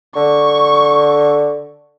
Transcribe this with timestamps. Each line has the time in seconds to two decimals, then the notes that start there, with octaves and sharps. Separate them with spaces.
0.16 D3 C#6